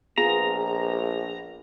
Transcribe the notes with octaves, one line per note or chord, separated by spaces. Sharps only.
A#1 B3 F4 G#4 A#5